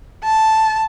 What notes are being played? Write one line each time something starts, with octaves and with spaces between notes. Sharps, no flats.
A5